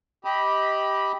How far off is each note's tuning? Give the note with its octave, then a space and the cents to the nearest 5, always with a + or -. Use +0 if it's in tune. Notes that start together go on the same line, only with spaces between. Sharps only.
G4 +0 D#5 +25 B5 -10